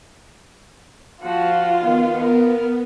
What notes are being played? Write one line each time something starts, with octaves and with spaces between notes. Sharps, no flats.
F3 F4 F#4
D#3 B3
A#4